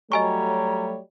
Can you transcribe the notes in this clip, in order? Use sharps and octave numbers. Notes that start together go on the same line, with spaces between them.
F#3 G3 A3 C#5 D#5 G#5 A#5 C#6